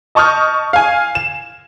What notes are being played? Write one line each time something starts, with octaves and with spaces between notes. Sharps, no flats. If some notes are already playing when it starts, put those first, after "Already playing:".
D#5 A5 C#6 D#6 F6 G6
F5 G#5
E7